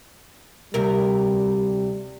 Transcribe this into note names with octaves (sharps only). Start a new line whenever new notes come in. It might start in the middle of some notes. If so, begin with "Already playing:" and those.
D2 C3 G3 A#4